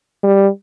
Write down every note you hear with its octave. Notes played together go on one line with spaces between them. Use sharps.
G3